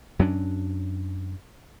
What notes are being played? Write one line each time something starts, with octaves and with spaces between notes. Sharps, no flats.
F#2 F#3 C#4 D4